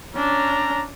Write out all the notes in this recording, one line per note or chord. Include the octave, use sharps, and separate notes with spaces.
C#4 D4 A#5